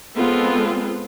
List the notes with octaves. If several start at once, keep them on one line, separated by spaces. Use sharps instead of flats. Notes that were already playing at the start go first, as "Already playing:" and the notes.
G#3 B3 C4 F4 A4